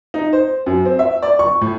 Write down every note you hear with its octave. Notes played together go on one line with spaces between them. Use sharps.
D#4
C5
F#2
C4
E5
D5
C#6
A2